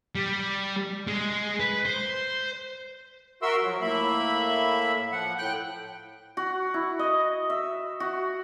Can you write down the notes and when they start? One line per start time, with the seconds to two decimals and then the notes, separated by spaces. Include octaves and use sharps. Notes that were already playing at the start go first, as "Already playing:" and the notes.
0.15 G3
1.07 G#3
1.60 B4
1.86 C5
3.42 F#4 A#4 E5 C6 E6
3.63 F3 F#3
3.81 A2 A#3 E5 B5
5.12 F3 F#5
5.38 A2 G5 F#6
6.37 F#4
6.74 E4
6.99 D#5
7.50 E5
8.00 F#4